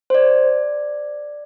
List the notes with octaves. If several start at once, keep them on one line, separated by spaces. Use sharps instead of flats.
C5
D5